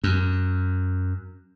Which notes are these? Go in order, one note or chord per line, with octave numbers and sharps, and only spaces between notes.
F#2